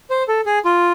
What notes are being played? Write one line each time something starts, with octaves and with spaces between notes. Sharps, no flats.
C5
A4
G#4
F4